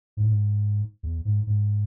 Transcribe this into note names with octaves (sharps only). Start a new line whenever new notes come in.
G#2
A2
G#2
E2
G#2
G#2